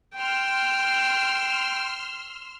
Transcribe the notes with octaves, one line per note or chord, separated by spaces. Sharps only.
G5 C6 E6 F6